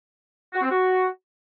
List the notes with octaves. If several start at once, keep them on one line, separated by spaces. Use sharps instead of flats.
F#4
C4
F#4